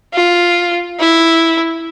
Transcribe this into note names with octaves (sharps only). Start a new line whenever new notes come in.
F4
E4